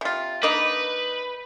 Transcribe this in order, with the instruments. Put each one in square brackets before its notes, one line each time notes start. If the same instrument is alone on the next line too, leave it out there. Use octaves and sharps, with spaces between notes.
[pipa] C3 F4
[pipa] A#3 D4 D#4 [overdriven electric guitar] B4